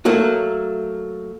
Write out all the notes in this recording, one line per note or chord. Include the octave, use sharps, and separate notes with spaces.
F#3 A3 A#3 F#4